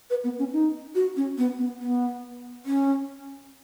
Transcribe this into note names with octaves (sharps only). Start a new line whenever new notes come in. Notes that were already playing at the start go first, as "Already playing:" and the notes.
B4
B3
C#4
D#4
F#4
C#4
B3
B3
B3
C#4